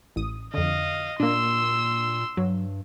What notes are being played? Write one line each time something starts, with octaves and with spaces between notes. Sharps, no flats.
A1 D#6
F2 D3 D#5 F5
A#2 A#3 D4 C6 E6
G2 F#3